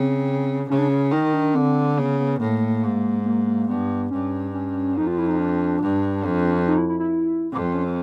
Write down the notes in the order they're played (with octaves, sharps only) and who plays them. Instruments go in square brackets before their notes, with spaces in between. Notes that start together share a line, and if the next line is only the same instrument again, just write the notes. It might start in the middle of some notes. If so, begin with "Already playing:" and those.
Already playing: [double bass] C#3 [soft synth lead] C4
[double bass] C#3 [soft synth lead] C#4
[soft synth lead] D4
C#4
[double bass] D#3 [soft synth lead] D#4
[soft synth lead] D4
[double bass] D3 [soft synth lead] C4
[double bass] C#3 [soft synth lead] B3
[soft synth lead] B3
[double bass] A2 [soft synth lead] A#3
[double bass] G#2
[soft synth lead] A#3
A#3
[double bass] G2 [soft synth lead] B3
[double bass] G2 [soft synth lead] C#4
[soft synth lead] C#4
[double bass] F2 [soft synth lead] D#4
[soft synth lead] F4
E4
D#4
D4
[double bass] G2
F2
[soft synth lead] D#4
E4
E4
E4
[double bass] F2 [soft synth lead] C4
[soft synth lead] C4
C#4
C4